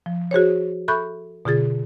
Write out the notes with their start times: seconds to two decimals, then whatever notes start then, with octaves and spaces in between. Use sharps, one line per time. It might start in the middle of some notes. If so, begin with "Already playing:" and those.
0.06 F3
0.31 F#4 G#4 C5 C#5
0.88 A4 E5 B5 C#6 F#6 G6
1.45 B2 D3 F4 G#4 A6